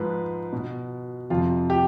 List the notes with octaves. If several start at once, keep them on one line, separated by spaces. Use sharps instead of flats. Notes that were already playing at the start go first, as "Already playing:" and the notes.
Already playing: G#2 F3 B4
B2
F2 C3 F3 F4
G4